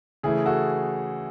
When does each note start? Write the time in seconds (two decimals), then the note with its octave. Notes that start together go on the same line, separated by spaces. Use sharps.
0.23 C#3 E3 A3 G#4
0.46 F#4 A4